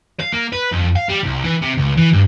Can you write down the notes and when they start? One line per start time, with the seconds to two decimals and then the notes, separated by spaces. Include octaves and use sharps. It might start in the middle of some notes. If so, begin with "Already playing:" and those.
0.20 F5
0.33 A#3
0.52 B4
0.72 F2
0.96 F5
1.09 G3
1.23 C2
1.44 E3
1.61 C3
1.77 C#2
1.97 E3
2.13 G2